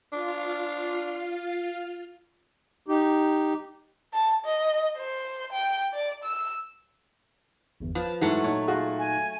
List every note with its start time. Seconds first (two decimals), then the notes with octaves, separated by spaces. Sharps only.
0.13 D4 F4 F5
2.88 D#4 G4
4.14 A5
4.45 D#5
4.97 C5
5.53 G5
5.93 D5
6.24 E6
7.80 G1 E2
7.95 F3 B4
8.21 G#2 E3 F#3 A3
8.44 A#2 D#4 C#5
8.68 F4 F#4 G#4
8.99 G#5